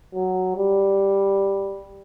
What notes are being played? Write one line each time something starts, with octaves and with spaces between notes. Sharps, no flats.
F#3
G3